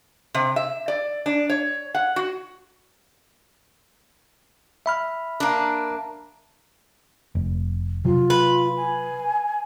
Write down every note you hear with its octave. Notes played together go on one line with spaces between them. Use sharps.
C3
E5
D5
D4
C#5
F#5
F#4
E5 B5 F6
A#3 D4
F1
C3 F#3 F4
B4
G#5